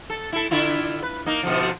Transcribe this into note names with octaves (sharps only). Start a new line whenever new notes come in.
A4
E4 A4
D3 E4 F4
B4
A#3 D#4
B2 D3 F3